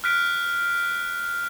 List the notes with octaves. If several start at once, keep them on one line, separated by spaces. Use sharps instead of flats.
F6 F#6 B6 D7